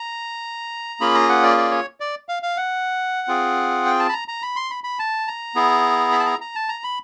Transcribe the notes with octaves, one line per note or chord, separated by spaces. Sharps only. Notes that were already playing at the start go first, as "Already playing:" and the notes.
Already playing: A#5
A#3 C#4 F4 G#4 B5
A#5
F#5
D5
D5
C#5
D5
F5
F5
F#5
C4 F4 G#4
G5
A5
B5
A#5
A#5
B5
C6
B5
B5
A5
A#5
B3 E4 G#4
B5
A5
A#5
A#5
A5
A#5
B5